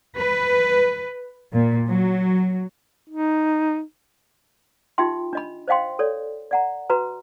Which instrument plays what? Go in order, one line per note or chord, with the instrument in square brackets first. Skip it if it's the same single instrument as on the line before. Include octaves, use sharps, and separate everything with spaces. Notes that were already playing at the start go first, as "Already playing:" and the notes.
[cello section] B4
A#2
F#3
[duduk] D#4
[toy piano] D#4 F4 G4 E5 G5 C6
D4 D#5 B5
C5 D#5 F5 G5 C6
A4 C#5 D5
D5 F#5 A#5
F#4 B4 A#5